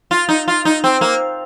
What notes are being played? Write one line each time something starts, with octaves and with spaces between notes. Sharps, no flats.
F4
D#4
F4
D#4
C4
A#3